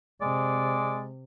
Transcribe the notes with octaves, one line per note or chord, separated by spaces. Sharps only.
C3 G#3 D5